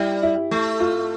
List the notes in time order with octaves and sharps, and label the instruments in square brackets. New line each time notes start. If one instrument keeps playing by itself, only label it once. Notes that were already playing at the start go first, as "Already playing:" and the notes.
Already playing: [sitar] G3 [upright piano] E4
[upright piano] E4
[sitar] A3
[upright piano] F4